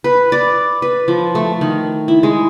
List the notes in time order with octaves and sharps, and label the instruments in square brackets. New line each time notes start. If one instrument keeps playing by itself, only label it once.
[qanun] B4
D5
B4
F3
A3
D#3
E4
G#3